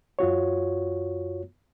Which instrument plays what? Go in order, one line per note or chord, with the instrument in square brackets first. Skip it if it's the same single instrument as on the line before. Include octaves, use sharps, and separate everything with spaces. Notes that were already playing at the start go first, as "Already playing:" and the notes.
[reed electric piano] F#2 F4 F#4 C#5